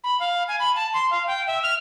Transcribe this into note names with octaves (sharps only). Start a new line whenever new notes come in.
B5
F5
G#5
B5
A5
C6
F5
G5
E5
F6